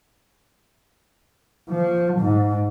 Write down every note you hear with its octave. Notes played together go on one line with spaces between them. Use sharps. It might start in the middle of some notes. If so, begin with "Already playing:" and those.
F3
G#2